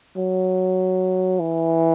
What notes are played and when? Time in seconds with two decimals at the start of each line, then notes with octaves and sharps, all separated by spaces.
0.17 F#3
1.40 E3